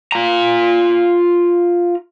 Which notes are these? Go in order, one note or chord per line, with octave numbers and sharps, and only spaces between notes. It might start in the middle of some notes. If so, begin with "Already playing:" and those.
F4 A#5